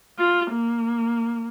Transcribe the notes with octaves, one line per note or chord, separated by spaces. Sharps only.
F4
A#3